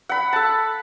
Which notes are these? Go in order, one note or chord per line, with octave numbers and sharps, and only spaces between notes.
F#5 B5
A4 A5